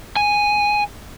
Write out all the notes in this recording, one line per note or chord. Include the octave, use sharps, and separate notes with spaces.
G#5